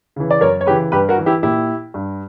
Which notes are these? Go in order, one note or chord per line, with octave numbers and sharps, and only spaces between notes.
C#3 E3
D5
F#2 A#4 C#5
C#5
C#3 E3 G4 B4
G2 G4 B4
F#4 A#4
E3
E4 G4
A#2 E4 G4
G2